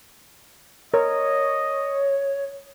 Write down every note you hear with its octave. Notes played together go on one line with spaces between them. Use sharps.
A#4 C#5 D#5